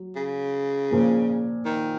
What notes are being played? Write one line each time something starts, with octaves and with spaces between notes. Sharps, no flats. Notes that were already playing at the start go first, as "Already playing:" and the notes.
Already playing: F#3
C#3
A#2 F3 A#3
D#3